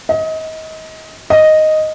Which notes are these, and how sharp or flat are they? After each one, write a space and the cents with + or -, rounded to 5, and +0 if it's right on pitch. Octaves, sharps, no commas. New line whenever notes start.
D#5 +30
D#5 +0